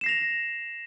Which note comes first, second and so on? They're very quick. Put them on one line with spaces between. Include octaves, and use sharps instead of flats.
E7 C7 A#6 F7